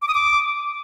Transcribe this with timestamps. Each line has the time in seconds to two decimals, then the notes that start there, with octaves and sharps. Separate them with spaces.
0.02 D6
0.08 D#6
0.14 D6